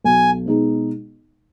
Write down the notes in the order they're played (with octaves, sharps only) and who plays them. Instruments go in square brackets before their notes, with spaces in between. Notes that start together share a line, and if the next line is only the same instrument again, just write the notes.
[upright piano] B1 [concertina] G#5
[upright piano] B2 G#3 D#4